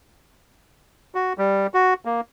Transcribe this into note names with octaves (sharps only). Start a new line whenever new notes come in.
F#4
G3
F#4
A#3